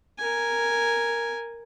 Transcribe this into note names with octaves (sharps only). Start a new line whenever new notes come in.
A#4 G#5